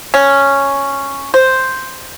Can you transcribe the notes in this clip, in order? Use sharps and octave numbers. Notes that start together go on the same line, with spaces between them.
C#4
C5